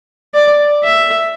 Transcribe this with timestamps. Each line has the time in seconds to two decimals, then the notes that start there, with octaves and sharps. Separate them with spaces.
0.34 D5
0.84 E5